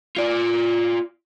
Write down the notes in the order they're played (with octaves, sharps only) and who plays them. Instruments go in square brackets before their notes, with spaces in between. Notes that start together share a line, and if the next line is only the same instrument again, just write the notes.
[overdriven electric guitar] F4 D5